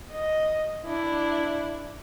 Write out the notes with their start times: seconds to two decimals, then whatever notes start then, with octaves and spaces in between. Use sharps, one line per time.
0.11 D#5
0.86 D4 E4